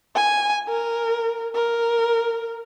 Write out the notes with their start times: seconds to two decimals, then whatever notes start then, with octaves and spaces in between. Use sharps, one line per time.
0.16 G#5
0.69 A#4
1.55 A#4